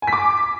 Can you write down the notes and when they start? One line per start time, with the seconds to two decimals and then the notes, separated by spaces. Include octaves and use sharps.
0.02 G#5
0.07 B6
0.13 D6